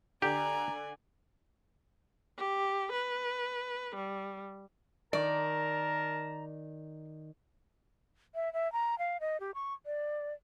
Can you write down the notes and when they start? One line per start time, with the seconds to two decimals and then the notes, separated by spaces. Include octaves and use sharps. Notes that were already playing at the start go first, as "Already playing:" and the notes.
0.22 D3 G4 D5 G#5 A#5
2.37 G4
2.92 B4
3.95 G3
5.13 D#3 A#4 D5 A5 A#5
8.35 E5
8.53 E5
8.73 A#5
8.99 F5
9.21 D#5
9.40 G4
9.55 C#6
9.86 D5